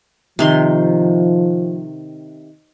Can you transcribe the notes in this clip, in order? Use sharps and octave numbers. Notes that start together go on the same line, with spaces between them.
C3 D#3 F3 C6